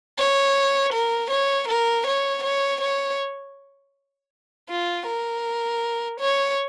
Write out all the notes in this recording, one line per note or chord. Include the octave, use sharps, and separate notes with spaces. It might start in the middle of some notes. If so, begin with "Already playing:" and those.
C#5
A#4
C#5
A#4
C#5
C#5
C#5
F4
A#4
C#5